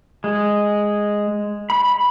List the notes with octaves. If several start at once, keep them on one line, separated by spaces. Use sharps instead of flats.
G#3
B5